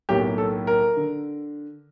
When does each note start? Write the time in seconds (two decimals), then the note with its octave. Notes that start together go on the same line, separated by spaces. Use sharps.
0.09 B1 A2 F#3 A#3 G4
0.38 A4
0.67 A#4
0.97 D3